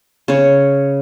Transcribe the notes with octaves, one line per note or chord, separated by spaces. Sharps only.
C#3 C#5